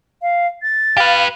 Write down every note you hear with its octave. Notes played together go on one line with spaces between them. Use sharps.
F5
A6
G4 B4 F5